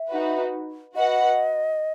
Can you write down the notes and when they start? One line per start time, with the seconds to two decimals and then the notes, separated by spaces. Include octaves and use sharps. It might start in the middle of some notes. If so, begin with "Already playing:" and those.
Already playing: E5
0.09 D#4 F#4 B4
0.95 F#4 B4 D#5 F#5